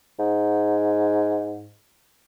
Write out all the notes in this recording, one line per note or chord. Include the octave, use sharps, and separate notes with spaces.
G#2